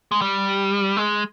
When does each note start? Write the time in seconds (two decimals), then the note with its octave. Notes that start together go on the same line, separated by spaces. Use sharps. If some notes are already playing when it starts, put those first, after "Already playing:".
0.12 G#3
0.21 G3
0.97 G#3